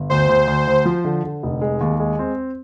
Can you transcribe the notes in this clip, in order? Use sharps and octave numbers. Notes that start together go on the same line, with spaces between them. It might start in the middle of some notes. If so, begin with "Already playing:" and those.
Already playing: G1
D2 C5
D2
D2
D2
F3
D3
D3
F1
G#3
D#2
G#3
C4